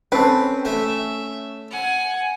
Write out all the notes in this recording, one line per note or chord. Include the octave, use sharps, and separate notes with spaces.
C4 C#4 A4 B4
A3 E5
F#5 G#5